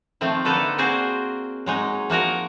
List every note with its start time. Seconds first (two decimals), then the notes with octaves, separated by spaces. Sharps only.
0.21 D#3 F3 A3 C4
0.45 D3 A#3 D#4 A4 B4 D5
0.78 A#3 C4 F#4 G#4 C5 D5
1.66 F#3 G#3 D#4
2.10 F3 A#3 F#4 A#4